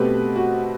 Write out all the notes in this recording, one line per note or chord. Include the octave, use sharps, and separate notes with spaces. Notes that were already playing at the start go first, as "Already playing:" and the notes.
Already playing: B2 A3 C4 G4 B4
F#4